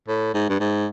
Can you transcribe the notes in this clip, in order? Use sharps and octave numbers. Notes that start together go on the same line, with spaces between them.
A2
G#2
G2
G#2